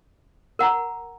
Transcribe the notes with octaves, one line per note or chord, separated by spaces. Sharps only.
A#4 F#5 A#5